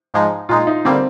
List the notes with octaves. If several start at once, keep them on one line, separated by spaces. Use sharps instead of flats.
G#2 F3 G#3 D#4
A#2 G#3 D#4 F4
D#4
D3 G3 A#3 C4